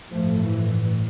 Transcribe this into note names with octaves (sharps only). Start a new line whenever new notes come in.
A1 G2 F3 A3
E3